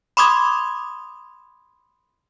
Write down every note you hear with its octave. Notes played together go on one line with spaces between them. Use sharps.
B5 C6 D6 D#6 G#6